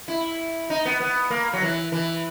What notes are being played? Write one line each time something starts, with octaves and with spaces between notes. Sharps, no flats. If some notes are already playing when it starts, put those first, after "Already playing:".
E4
D#4
B3
B3
A#3
F#3
E3
E3